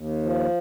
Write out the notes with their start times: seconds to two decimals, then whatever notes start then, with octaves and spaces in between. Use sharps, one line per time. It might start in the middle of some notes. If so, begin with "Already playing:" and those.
Already playing: D#2
0.23 F3